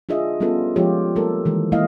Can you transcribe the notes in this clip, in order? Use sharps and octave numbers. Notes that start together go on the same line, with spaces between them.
D4 F4 G#4 D#5 E5
G3 B3 C#4 F4 A4 B4
F3 G#3 F4 G4 C#5
G3 A#3 A4 A#4
D#3 E3 G#3
G3 G#3 A#3 E4 D#5 F5